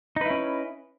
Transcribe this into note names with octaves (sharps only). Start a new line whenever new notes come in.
C#4 D#4 E4 B4